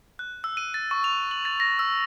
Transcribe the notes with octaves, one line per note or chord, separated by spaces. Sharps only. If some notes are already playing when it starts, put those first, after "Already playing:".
F#6
E6
D#7
A6
C#6
F7
F#7
A6
A#6
E6